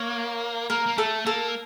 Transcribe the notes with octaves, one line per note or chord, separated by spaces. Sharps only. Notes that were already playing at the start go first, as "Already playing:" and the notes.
Already playing: A#3 C#5
A#3 A#4
A#3
A3 A4
A#3 A4